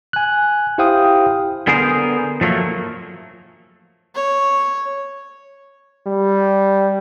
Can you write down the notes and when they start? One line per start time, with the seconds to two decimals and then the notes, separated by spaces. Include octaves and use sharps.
0.13 G#5 F#6
0.78 E4 G4 C5 F5 G5 D#6
1.67 D3 B3 G#4 A#4 C5
2.41 F3 F#3 A3 A#3
4.15 C#5
6.06 G3